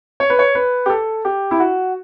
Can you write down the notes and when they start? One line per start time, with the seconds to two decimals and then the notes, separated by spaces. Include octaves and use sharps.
0.20 C#5
0.30 B4
0.39 C#5
0.55 B4
0.86 G4
0.90 A4
1.25 G4
1.51 E4
1.60 F#4